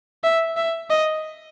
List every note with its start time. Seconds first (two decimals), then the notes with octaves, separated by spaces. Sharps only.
0.24 E5
0.57 E5
0.90 D#5